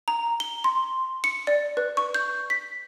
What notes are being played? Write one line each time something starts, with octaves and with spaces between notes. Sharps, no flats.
A#5
G7
C6
C#7
D5
B4
C#6
G6
B6